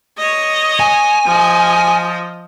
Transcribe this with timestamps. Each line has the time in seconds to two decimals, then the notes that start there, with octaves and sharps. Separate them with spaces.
0.18 C#5 D#5
0.80 G#5
1.26 F3 D#5